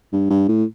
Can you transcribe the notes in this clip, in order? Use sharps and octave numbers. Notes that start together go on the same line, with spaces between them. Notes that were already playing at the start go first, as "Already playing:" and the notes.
G2
G2
A2